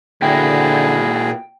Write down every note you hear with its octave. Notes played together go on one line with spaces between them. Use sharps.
A#2 D3 E4 F#4 G#4 G5